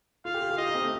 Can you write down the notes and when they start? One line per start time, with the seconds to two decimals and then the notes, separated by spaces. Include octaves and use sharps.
0.25 F4 F5
0.34 G4
0.42 F4
0.50 G4
0.57 F4 D#5
0.67 D#4
0.75 C4
0.82 A3